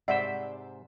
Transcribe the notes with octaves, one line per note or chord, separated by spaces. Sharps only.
G#2 C3 C5 D5 E5 F#5